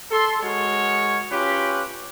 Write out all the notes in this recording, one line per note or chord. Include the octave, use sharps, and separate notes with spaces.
A4 C6
G#3 F#4 A#4 C#5
C#4 F4 G4 B4